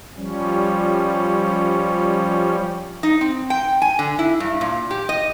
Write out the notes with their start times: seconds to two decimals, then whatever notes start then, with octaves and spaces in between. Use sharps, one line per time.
0.16 F3 G3 C#4
3.03 D#4
3.21 C4
3.50 G5
3.82 G#5
3.99 D3
4.19 E4
4.40 G2
4.61 A#2
4.91 G4
5.09 D#5